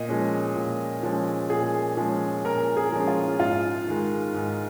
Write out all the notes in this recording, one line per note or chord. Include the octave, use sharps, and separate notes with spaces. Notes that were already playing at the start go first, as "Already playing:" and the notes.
Already playing: A#2 D#5
F3 G#3 C#4
A#2
F3 G#3 C#4
A#2 G#4
F3 G#3 C#4
A#2 A#4
G#4
F3 G#3 C#4
F4
G#2 F4
D#3 G#3
G#2